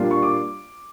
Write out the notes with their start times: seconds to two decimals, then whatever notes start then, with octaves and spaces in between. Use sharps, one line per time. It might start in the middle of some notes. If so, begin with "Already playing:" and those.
Already playing: A#2 G3 A#3 D4 F4
0.11 C#6
0.23 D6